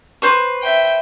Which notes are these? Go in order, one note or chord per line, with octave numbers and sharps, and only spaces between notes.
B4 C5 C#6
E5 G5